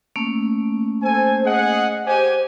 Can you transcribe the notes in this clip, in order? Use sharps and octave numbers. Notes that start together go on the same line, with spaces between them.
A3 A#3 C#4
A4 C5 G#5
G#4 D#5 F#5
G4 C5 G#5